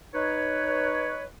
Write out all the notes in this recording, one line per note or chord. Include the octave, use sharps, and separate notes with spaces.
D#4 B4 C#5